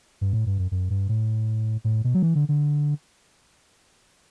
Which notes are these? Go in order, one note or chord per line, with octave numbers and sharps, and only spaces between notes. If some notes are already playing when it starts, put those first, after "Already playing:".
G2
A2
G2
F#2
F#2
G2
A2
A2
B2
F#3
E3
D3
D3